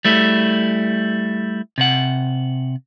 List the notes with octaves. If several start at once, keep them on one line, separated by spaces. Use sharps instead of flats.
G3 A3 E4
C3 F#5